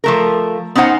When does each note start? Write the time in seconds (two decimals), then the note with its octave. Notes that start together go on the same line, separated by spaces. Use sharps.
0.04 F3 A3 A#4
0.75 B3 C#4 D#4 C5 F#5